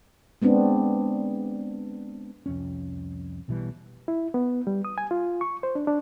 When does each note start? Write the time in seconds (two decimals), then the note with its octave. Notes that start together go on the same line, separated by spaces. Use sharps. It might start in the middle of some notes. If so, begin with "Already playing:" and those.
0.42 G#3 B3 C4 D4
2.46 C2 F2 C#4
3.48 B1 B2 E3 G3
4.08 E4
4.34 B3
4.67 G3
4.85 D#6
4.98 G#5
5.11 F4
5.41 C#6
5.63 C5
5.75 D4
5.87 D4